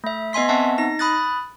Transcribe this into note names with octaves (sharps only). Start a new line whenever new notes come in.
A3 E5
B3 D#5 G#5 C6 B6
B3 C4 E5 F#5 A5
D#4 A#6
B5 D#6 F#6 A6